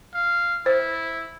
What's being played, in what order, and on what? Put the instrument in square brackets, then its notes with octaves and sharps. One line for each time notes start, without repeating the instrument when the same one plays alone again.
[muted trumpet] F5
[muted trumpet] E4 [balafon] C5